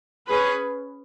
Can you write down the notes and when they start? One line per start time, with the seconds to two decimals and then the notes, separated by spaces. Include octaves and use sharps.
0.27 C#4 G#4 B4